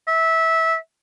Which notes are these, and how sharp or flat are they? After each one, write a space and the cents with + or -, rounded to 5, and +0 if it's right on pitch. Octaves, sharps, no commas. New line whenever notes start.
E5 -20